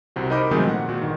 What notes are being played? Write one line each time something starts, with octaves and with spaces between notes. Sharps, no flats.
C2 C3 F#4
D#4 A#4 C5 D#5 B5 D6
D#3 F3 F#3 G#3 A3 C4
A#2 F#5
A#2 F#4
G1 D#3